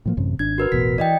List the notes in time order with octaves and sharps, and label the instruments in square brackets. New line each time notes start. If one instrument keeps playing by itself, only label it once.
[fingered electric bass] A2 F3 A#3
A1 F#2 C3
[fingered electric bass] G#1 D4 [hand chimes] G#6
[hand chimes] F#4 A#4 B4
[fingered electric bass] E1 A1 B2 [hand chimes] B6
[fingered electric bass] E3 [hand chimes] D5 D#5 G5